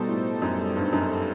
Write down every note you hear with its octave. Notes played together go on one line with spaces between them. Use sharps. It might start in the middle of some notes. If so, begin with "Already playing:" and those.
Already playing: B2 G3 D#4 A4 C5
A2
F#2
G2
F#2